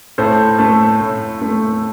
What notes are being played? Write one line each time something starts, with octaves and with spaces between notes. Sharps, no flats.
A2 A4 C5
A3 A4
A2
A3